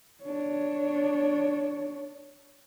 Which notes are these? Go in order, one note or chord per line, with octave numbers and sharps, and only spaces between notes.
D4 C#5